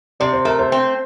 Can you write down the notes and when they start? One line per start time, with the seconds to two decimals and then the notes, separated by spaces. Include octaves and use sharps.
0.20 C3 D5
0.33 C5
0.45 A3 A#4
0.59 C5
0.72 C4